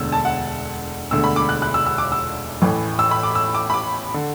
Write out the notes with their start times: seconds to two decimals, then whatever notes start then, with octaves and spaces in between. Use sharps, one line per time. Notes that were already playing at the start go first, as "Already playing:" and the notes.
Already playing: E1 D2 D3 E6
0.12 A5
0.25 F#5
1.11 E1 D2 D3 E6
1.24 B5
1.36 D6
1.49 F#6
1.62 F#6
1.74 E6
1.86 E6
1.98 D6
2.12 E6
2.62 A1 A2 E3
2.99 E6
3.11 B5
3.23 D6
3.35 E6
3.55 D6
3.70 B5
3.74 D6
4.14 D3